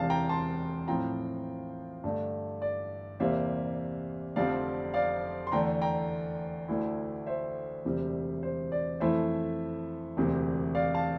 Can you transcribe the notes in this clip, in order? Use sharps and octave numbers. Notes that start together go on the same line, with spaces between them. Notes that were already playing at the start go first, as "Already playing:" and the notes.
Already playing: E1 E2 C3 F5 A5
G5 A#5
A5 C6
A2 F3 C4 F4 G5 A#5
G2 D3 A3
D5
E2 C3 G3 A#3 C5 E5
F1 F2 D3 G3 C4 D5 F5
D5 F5
C6
E2 D3 A3 G5 A#5
G5 A#5
D2 D3 A3 E4
C5 E5
E1 D2 C3 G3
C5
D5
F2 E3 A3 E4 C5 E5
E1 D2 C3
D5 F5
F5 A5